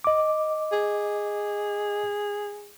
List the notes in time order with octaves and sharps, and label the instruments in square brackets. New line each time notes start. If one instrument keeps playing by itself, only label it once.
[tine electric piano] D#5 D6
[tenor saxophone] G#4